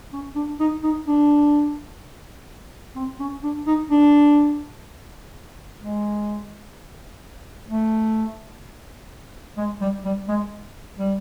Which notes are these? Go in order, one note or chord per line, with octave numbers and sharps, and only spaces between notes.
C#4
D4
D#4
D#4
D4
C4
C#4
D4
D#4
D4
G#3
A3
G#3
G3
G3
G#3
G3